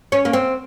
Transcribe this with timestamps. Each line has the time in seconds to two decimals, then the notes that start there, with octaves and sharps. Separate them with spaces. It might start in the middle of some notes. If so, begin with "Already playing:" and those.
0.12 C#4
0.25 A#3
0.33 C4